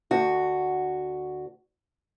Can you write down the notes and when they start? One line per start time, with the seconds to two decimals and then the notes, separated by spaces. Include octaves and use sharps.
0.11 D2 F#4